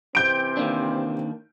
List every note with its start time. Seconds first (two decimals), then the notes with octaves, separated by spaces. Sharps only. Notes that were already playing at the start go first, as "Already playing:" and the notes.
0.15 C3 E3 C4 G6 D7
0.57 D#3 A#3 D4